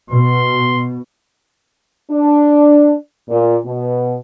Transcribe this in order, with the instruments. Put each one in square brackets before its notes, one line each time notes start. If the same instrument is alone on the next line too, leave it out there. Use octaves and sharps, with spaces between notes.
[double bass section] B2 [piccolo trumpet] C6
[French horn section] D4
A#2
B2